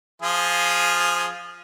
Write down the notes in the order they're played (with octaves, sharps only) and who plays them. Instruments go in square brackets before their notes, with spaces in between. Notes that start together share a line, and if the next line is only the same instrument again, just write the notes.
[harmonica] F3 F4 G#4